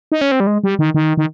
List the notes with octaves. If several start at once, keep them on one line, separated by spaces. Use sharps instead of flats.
D#4
C#4
C4
G3
G#3
G3
D#3
D#3
D#3